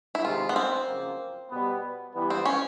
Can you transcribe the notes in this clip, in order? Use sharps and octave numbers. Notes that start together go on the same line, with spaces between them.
E4
C3 D#3 G#3 F4
B3
C4
F#2 C#3 F3 A#3
B2 G3 B3
E3 G3 B3
C4
C#4